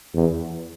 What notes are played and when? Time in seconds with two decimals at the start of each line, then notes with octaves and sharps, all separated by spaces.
0.14 E2